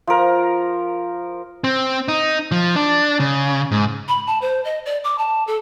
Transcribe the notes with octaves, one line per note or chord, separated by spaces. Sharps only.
F3 A#4
C4
D#4
F3
D4
C#3
G#2
B5
A5
C5
D#5
D5
D6
A5
A4